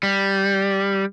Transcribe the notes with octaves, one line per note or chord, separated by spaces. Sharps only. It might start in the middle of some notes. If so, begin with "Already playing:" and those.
G3